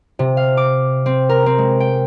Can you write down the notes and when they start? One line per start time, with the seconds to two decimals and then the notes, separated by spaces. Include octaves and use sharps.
0.19 C3
0.37 F5
0.57 D6
1.06 C4
1.29 A#4
1.46 C4
1.58 G#3
1.80 G5